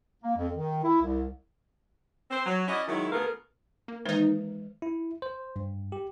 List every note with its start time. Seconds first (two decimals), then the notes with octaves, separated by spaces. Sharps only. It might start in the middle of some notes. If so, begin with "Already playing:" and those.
0.22 A#3
0.36 F2
0.54 D#3
0.83 E4
1.02 C2
2.31 C4 C5
2.46 F#3
2.68 C#4 E4 F#4 D5 D#5
2.88 D#3 F#3 G#3 E4
3.12 D2 A3 B3 G#4 A#4 F5
3.88 A#3
4.05 D#3 E3 G#3 D#4 C5
4.82 E4
5.22 C5
5.56 G2
5.92 G4